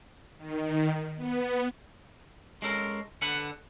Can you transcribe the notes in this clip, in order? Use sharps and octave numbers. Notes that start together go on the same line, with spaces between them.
D#3
B3
G#3 C#4 A4 A#4
D3 A4 B4 F#5